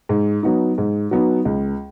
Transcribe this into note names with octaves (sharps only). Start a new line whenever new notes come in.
G#2
F#3 B3 D#4
G#2
F#3 B3 D#4
C#2